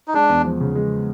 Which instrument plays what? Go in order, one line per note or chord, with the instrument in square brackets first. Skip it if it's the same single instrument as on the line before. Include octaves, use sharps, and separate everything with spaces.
[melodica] D#4
[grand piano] G#3 [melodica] D4
[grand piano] E2
F3
C#3
G#3